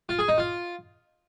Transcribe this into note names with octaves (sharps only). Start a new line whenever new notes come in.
F4
G#4
D#4
F4